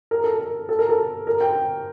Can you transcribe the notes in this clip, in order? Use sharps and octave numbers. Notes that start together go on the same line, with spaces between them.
A#4
A4
A#4
A4
A#4
A4
A#4
G5